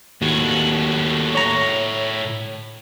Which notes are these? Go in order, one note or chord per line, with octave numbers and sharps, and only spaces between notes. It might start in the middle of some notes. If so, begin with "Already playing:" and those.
D#2 A2 F#4
C#5 A#5